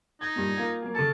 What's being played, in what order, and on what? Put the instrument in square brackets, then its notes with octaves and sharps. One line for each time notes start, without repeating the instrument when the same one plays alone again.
[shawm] D#4 [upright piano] G#6
[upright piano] G2 A#2
A#3 F4 G#6
F#3 A#3
[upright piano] C#3 A4 [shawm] A5